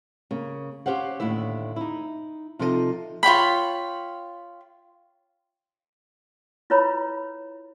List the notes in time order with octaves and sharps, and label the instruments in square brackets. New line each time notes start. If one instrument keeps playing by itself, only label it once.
[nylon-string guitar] C#3 A#3
C#4 G4 C5 F5 F#5
D#2 A2 D3 E4 E5
D#4 E4
C3 F3 D#4 A4 A#4 D#5
[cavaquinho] F4 C#5 G5 B5
[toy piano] E4 F4 B4 C#5 A#5 B5